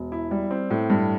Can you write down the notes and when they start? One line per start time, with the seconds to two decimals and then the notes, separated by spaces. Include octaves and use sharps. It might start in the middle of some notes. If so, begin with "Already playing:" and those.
Already playing: E1
0.12 E4
0.31 G3
0.51 C4
0.70 A2
0.90 G2